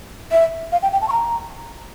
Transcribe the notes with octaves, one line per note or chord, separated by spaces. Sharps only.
E5
F5
G5
G5
A5
C#6
A#5